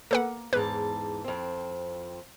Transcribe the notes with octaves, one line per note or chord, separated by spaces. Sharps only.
A#3 A4 B4 F#5
E2 G#2 B4 A5
F2 C4